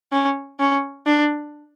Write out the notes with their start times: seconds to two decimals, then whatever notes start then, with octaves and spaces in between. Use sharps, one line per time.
0.13 C#4
0.60 C#4
1.06 D4